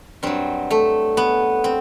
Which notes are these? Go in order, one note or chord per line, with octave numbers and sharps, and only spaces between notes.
G2 F#3 C4
A3
B3
C4